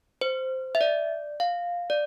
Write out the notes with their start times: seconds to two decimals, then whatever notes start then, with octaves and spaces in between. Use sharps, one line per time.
0.21 C5
0.75 E5
0.81 D5
1.40 F5
1.90 D5